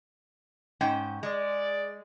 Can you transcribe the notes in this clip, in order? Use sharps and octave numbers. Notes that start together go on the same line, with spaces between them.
G#2 C#4 G5
G#3 G#4 D5